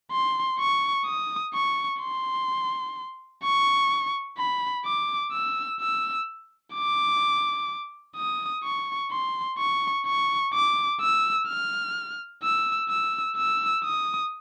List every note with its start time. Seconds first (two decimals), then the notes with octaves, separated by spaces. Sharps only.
0.12 C6
0.60 C#6
1.06 D#6
1.54 C#6
2.01 C6
3.44 C#6
4.38 B5
4.85 D6
5.32 E6
5.81 E6
6.74 D6
8.17 D#6
8.63 C#6
9.11 C6
9.58 C#6
10.06 C#6
10.54 D6
11.01 E6
11.48 F6
12.43 E6
12.90 E6
13.37 E6
13.85 D#6